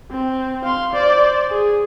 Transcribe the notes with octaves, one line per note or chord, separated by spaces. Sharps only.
C4
F5 C6
C5 D5
G#4